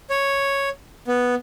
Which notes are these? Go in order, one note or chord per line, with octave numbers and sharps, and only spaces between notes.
C#5
B3